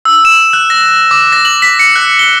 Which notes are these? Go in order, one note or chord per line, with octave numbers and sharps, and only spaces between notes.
E6
E7
F#6
A#6
D6
A#6
F#7
B6
C#7
F#6
G7